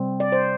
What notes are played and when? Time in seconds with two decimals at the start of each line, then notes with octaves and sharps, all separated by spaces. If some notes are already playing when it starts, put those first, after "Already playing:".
Already playing: C3 G3 C4
0.20 D5
0.32 C5